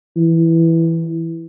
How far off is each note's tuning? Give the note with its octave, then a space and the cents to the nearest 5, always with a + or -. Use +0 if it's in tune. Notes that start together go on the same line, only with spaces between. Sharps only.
E3 +0